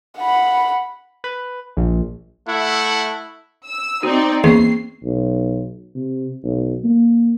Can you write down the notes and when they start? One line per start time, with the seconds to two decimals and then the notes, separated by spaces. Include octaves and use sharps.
0.18 F#5 B5
1.24 B4
1.77 A#1
2.48 A3 E4 F#5
3.67 E6
4.03 C4 D#4 F#4 D5
4.44 E2 A#3 C#4 C#6 C7
5.04 B1
5.95 C3
6.44 B1
6.84 A#3